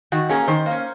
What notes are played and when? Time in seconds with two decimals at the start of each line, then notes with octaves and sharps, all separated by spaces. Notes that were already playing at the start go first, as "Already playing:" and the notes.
0.12 D#3 F#4
0.29 A#3 C#4 G#4
0.48 D#3 C5
0.66 A#3
0.71 C#4